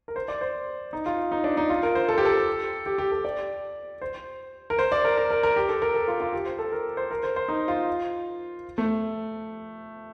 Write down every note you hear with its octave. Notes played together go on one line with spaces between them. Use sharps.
A#4
C5
D5
C5
D#4
F4
D#4
D4
D#4
F4
A#4
C5
A4
G4
A4
G4
G4
A4
D5
C5
A#4
C5
D5
A#4
A#4
A#4
A#4
G4
A4
A#4
A4
F4
F4
G4
C5
A4
A#4
C5
A#4
C5
C5
D#4
F4
A3